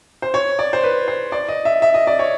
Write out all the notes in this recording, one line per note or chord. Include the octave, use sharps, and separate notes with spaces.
C5
C#5
D5
C5
B4
C5
D5
D#5
E5
E5
D#5
D5
C#5